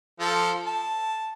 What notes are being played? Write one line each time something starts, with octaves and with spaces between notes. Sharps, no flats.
F3 A4
A5